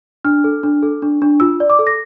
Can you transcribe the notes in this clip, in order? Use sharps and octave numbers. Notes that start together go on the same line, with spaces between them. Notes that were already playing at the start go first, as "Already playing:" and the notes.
D4 F6
A4
D4
A4
D4
D4
F4 E6
D5
D6
A4
A#6